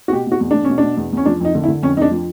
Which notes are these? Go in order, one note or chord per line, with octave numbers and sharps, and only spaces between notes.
F#4
B2 G4
B2
F#4
E2
E2 D4
B2 C#4
D4
B2
E2
E2 C#4
F3 D4
F2 D#4
D3
E4
D3
F2 C#4
F2 D4 D#4
F3